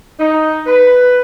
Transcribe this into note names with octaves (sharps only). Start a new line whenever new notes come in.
D#4
B4